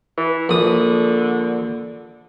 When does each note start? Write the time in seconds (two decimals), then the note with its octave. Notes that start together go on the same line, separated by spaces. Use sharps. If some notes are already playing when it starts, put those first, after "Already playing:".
0.17 E3
0.49 A#1 D3 D#6